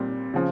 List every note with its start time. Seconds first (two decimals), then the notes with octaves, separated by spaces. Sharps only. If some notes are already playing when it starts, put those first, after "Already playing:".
Already playing: A#2 G3 C4
0.34 C#3 F3